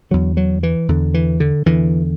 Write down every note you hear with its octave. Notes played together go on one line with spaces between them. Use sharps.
E2 D3 F#3
F#3
E3
E2 D3
E3
D3
E2 D3 E3